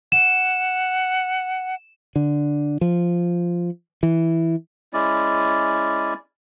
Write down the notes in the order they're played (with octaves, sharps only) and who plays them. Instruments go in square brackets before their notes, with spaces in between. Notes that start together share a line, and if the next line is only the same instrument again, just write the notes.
[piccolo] F#5 [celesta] E7
[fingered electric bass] D3
F3
E3
[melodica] G#3 C#4 E4 D5